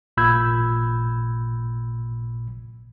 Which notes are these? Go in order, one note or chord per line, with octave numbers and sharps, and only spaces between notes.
A1 A#2 B5 E6 G6 G#6